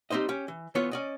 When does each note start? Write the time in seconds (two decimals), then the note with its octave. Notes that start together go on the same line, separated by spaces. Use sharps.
0.10 G3 C4 D#4 C5 D#5
0.29 C#4 G4
0.48 E3
0.75 E2 E3 B3 F4 C#5
0.91 C#4 D5 D#5